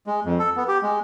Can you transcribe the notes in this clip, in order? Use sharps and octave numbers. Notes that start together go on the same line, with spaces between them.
G#3
F2
A4
B3
G4
G#3